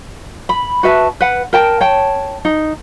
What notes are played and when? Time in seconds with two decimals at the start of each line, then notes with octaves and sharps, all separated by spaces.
0.49 B5
0.83 F#4 B4 E5 A5
1.21 B4 F#5
1.53 A#4 G5 A5
1.81 C#5 G5 A5
2.45 D#4